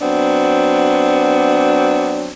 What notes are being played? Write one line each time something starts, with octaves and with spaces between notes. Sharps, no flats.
F#3 B3 C4 D4